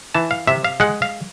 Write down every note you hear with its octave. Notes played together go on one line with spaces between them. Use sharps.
E3 A5
F5
C3 E5
F5
G#3 F#5
F5